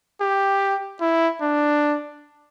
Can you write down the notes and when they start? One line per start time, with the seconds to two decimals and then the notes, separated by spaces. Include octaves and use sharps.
0.21 G4
1.01 E4
1.42 D4